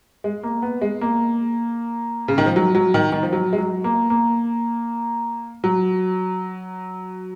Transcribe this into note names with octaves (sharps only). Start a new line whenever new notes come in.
G#3
A#3
B3
G#3
A#3
C#3
D#3
F3
F#3
F#3
D#3
D#3
F3
F#3
G#3
F#3
A#3
A#3
F#3